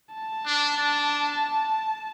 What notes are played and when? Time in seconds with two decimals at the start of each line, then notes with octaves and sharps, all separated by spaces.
0.14 A5
0.46 D4
0.77 D4